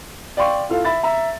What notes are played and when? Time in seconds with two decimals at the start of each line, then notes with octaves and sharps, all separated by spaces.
0.37 D5 F5 G5 C6 C#6
0.69 E4 F4 A4 F5
0.85 E5 B5 A6
1.03 E5 A#5